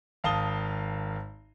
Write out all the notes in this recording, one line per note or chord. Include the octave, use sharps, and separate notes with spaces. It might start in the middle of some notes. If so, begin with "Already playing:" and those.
G#1 F5 A5 D#6 G7